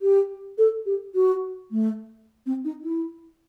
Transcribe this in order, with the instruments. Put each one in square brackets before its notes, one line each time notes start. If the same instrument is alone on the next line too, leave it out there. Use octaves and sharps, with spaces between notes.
[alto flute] G4
A4
G4
F#4
A3
C4
D#4
E4